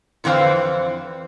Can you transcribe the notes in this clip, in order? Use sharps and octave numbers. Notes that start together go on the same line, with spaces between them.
F2 D3 E3 C4 C5 F5